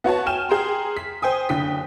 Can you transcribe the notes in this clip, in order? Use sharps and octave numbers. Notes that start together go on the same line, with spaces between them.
B3 F#4 C#5 A5
G5 G#5 F6 E7
G#4 G5 A#5 C6
B6
C5 G5 G#5 D#6
F#1 D3 G5 D#6 B6